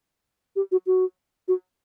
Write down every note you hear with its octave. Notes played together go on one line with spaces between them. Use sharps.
G4
F#4
F#4
F#4